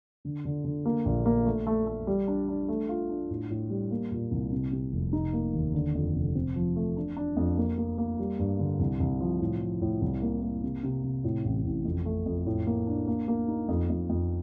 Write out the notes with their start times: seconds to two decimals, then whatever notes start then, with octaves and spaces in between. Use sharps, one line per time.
0.25 D3
0.45 D3
0.64 D3
0.85 A#3
1.05 A#1
1.26 A#3
1.46 A3
1.67 A3
1.87 A3
2.07 G3
2.28 D4
2.49 D4
2.68 A3
2.89 F4
3.09 D4
3.30 A2
3.50 A2
3.70 G3
3.91 A#3
4.11 A#2
4.31 C2
4.52 C3
4.72 C3
4.93 F1
5.13 D#4
5.33 A#3
5.53 D#2
5.74 D3
5.95 F2
6.15 F1
6.35 C4
6.56 F3
6.76 A3
6.97 D4
7.17 D4
7.36 F2
7.57 A#3
7.78 A#3
7.98 A#3
8.19 G3
8.39 G2
8.59 D3
8.80 C2
9.00 C2
9.20 F3
9.41 A2
9.61 F3
9.82 A2
10.01 C2
10.22 A#3
10.43 A#3
10.63 C3
10.84 C3
11.03 C3
11.24 A2
11.45 A1
11.65 A1
11.85 F2
12.06 A3
12.26 F2
12.46 A2
12.67 A#3
12.87 D4
13.08 A#3
13.28 A#3
13.48 D#4
13.68 F2
13.90 F2
14.09 F2